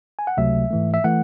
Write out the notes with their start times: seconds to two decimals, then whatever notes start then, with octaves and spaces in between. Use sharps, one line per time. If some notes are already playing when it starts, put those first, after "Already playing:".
0.19 G#5
0.27 F#5
0.37 C#2 C3 F#3 A3 E5
0.70 G#2 E3 A3
0.94 E5
1.04 E3 A3 F#5